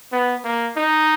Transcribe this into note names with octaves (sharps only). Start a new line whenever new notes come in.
B3
A#3
D#4